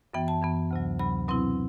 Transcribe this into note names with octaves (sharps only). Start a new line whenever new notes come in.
F#2 E3 B3 G5
A5
F#2 E3 B3
D2 C3 F#3
D2 C3 F#3 B5
B2 F#3 C4 E4